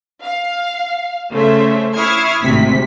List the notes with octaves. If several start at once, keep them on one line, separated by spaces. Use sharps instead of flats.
F5
C#3 A3 C#4 C5 E5
E4 C#6 D#6 F6 G#6 C7
G#1 D2 C3 B6